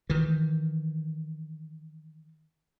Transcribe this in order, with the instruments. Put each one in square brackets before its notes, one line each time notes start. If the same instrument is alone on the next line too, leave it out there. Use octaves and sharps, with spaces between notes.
[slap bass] D#3 E3